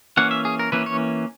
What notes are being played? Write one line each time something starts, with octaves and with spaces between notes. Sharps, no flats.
E3 A#3 C#4 F#5
E5
G#4
A#4
E3 A#3 C#4 B4
C#5